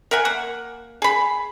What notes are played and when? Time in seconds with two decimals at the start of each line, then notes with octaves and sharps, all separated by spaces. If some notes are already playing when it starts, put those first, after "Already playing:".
0.11 A#4 E5 F#5 G#5
0.25 A#3 F#5
1.02 G#4 B5